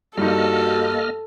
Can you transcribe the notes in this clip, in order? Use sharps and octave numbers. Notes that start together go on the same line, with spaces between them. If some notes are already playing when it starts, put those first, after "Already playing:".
G2 A#3 D#4 F#4 A4 D#5 F6